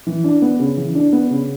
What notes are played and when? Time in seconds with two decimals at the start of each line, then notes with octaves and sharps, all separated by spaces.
0.07 E3
0.24 D4
0.42 B3
0.59 C#3
0.77 E3
0.95 D4
1.13 B3
1.30 C#3